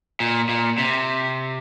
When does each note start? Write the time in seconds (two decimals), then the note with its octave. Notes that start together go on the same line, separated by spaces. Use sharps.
0.20 A#2
0.49 A#2
0.78 C3